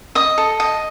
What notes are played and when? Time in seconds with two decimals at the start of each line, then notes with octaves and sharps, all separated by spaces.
0.15 D#5 D#6
0.38 A4
0.60 D#5